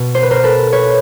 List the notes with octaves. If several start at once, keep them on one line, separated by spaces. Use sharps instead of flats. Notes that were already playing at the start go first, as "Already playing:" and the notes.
Already playing: B2
C5
B4
A#4 C5
A4 B4
B4 C#5